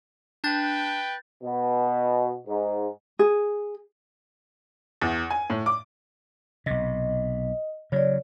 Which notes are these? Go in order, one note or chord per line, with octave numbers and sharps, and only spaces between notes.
D4 B4 G5 G6 A6
B2
G#2
G#4
E2
G#5
A2
D6
B1 C3 D#5
C#3 F#3 C#5 D5